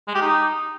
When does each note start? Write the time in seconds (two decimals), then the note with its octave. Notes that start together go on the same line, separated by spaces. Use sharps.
0.08 G#3
0.15 G4
0.22 D#4